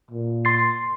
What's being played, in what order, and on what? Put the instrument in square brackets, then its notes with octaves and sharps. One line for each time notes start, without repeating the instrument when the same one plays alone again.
[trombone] A#2
[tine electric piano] C6 A6 C7